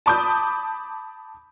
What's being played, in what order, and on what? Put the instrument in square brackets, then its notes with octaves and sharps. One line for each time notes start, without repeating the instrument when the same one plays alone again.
[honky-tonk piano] A5 B5 D6 D#6 G6